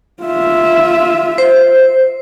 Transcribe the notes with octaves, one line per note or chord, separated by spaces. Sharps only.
F4 E5
C5